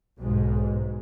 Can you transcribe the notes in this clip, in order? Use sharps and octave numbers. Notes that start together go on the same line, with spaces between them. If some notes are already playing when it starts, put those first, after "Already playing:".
B1 G#2 G#3